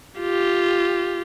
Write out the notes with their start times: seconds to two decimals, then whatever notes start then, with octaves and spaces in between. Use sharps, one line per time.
0.21 F4 G4